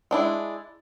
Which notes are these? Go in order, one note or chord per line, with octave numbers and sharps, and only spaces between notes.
G#3 D4 E4